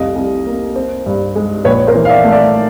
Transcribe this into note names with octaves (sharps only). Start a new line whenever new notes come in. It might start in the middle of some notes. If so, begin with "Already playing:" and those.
Already playing: F1 C2 D#5 F5
C2
A#3
C4
G2
G#3
A#1 B4 C#5
A#4 C5
E3
F5
D5 E5
A3
D5 E5